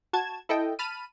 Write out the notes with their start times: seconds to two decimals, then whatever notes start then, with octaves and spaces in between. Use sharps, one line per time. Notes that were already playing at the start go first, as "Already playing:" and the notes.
0.13 F#4 A5 G#6 E7
0.49 E4 A4 D#5 G5
0.79 A5 B5 F6 D#7